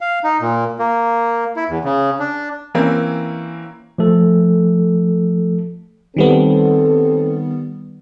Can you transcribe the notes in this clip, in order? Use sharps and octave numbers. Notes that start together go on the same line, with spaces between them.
F5
D#4
A#2
A#3
E4
E2
C#3
D4
E3 A#3 C4 C#4 E4
F3 A3 A4
D#3 G3 B3 C4 A4